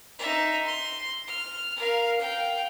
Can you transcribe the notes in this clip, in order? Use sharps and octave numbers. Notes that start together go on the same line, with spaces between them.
D#4 E5
C6
F6
A#4 F5
F5 G5